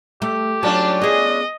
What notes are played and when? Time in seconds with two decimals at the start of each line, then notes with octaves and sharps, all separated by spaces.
0.22 A3 G4
0.63 F#3 C#4 D4 F4 A5
1.02 B3 G#4 D#5